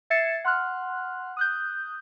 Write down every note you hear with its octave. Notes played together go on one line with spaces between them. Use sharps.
E5 G#6 A6 C7 C#7 E7
F#5 C6 F6 F#6
D#6 F#6 G6